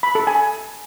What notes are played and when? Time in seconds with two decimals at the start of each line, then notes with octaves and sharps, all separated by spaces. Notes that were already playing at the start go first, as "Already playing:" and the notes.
0.03 B5
0.15 A4
0.27 G#5